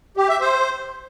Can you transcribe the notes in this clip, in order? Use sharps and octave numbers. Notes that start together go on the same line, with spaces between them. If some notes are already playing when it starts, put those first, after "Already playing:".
G4
E5
C5